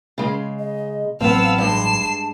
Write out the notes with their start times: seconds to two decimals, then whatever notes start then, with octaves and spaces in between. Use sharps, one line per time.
0.18 C#3 G#3
0.59 D#5
1.21 A1 F#3 B3 C4 F5 A5 E6
1.58 G2 G#3 C7 E7